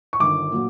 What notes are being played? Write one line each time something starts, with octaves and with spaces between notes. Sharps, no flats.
C#6
G1 G2 D#3 D6
A#2 F#3